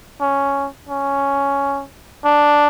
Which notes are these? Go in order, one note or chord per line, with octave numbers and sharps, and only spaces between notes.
C#4
C#4
D4